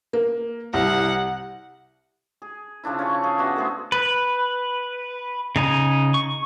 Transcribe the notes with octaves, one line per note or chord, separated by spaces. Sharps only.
A#3
C2 F#5
G#4
C#3 F3 D4 E4
C#4 A4 C#6
G#4
B3 D4 F#4 E5
A3 G#4 C5
B4
C#3 D#4 G#5
C#6